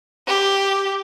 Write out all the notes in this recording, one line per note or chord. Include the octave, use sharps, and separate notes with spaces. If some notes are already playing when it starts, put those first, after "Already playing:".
G4